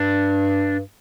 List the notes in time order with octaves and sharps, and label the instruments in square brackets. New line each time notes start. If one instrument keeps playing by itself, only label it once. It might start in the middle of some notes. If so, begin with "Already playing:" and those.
Already playing: [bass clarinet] G2 [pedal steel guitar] D4